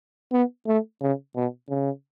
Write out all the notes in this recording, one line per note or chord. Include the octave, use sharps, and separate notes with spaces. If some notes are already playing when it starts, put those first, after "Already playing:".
B3
A3
C#3
B2
C#3